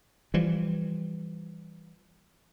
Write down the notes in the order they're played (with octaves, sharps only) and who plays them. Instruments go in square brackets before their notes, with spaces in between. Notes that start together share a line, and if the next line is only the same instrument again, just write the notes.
[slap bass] E3 F3 G3